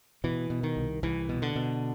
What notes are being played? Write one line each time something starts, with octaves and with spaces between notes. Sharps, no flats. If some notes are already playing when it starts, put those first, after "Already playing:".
B2 E3
B2
D#3
C2
C2 E3
B2
D3
B2